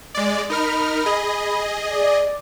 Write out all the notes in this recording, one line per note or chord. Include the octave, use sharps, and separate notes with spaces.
G#3 D5
D#4 A#4 B5 F6
G#4 D#5
D5